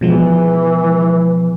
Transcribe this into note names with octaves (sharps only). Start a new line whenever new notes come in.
B2 E3 F3 G#3